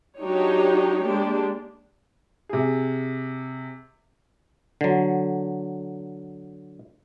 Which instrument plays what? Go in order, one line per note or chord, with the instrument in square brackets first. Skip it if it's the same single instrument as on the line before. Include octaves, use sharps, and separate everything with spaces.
[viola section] F#3 D4 D#4 G4 C#5
G#3 A#3 D4 G4
[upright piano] C3 G#4
[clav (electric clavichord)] D3 F#3